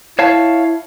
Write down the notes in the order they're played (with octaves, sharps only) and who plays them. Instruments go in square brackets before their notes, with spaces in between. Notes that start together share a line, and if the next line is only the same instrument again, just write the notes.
[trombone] E4 [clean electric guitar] C#5 F5 A5